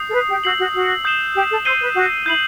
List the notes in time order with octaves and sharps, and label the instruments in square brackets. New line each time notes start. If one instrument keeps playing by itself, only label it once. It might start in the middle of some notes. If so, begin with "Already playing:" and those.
Already playing: [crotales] D#6 G6 C7
[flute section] A4
B4
G4
[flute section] F#4 [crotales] E6 G6 C7 F#7
[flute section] F#4
F#4
[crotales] D#6 G6 C7 E7 G7
[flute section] G4
A4
[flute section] C5 [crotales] E6 G6 C7 D#7 G7
[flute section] B4
F#4
[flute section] E4 [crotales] G6 C7 F#7